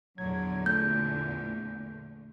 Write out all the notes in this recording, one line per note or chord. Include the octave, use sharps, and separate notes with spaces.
A#1 E2 D3 F#3 G#6
A#2 A3 G6